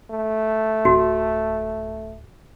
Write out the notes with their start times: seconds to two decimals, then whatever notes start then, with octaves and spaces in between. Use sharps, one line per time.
0.10 A3
0.85 D1 F#4